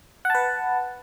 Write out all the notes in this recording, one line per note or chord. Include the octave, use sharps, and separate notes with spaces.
B4 F#5 A5